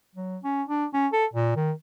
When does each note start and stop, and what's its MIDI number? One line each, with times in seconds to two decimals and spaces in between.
0.15 0.38 54
0.44 0.63 61
0.69 0.86 62
0.94 1.08 61
1.13 1.26 69
1.34 1.56 46
1.56 1.72 51